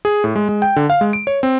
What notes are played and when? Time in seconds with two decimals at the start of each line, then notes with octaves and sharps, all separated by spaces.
0.05 G#4
0.24 A2
0.36 G#3
0.49 G#3
0.62 G5
0.76 D3
0.90 F5
1.01 G#3
1.13 D7
1.27 C#5
1.43 C4